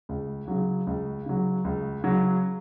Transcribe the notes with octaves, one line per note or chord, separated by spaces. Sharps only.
C#2
C#3 F#3
C#2
C#3 F#3
C#2
C#3 F#3